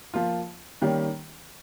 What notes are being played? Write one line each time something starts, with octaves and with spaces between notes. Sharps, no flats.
F3 A#3 F4
D#3 G3 A#3 C#4 G4